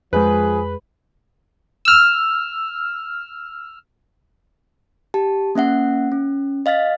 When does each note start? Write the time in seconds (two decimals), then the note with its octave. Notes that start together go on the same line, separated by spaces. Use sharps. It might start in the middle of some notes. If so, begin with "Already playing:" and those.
0.13 F2 F3 G#3 G#4 B4
1.85 E6 F6
5.14 G4 A5
5.55 A#3 C#4 E5 F#5
6.12 C#4
6.66 D#5 F5 F6 A6 B6